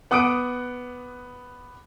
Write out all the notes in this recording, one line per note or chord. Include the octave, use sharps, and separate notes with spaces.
B3 F#5 D6 D#6 F#6 D7